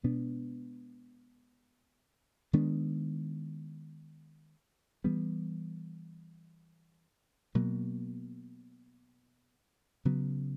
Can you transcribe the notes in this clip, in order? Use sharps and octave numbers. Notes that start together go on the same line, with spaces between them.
B2 G#3 B3 D4
D#3 G#3 B3 D4
E3 G3 B3
B2 F#3 A#3
C#3 F#3 B3